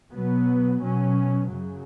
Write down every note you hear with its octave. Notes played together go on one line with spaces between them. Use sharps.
B2 F#3 B3
B2 F#3 C#4
F#2 C#3 F#3